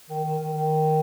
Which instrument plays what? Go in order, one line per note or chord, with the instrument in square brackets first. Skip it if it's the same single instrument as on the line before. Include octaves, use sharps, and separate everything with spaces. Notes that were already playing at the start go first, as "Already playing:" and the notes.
[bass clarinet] D#3
D#3
D#3
D#3